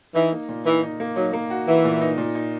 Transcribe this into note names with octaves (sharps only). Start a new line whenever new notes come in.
E3 D#4
A#3
A#2
E3 D#4
D#4
A#3
F#3 D#4
A#3
F#4
E3 F#4
A#2
D#4
A#2
D#4